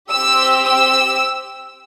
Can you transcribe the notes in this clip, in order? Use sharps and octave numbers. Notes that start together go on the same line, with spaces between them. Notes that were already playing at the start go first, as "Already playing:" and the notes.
C4 G4 E6
E6